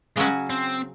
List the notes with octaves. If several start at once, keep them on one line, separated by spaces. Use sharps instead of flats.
C#3 F#3 G#3 C#4 F#4
C4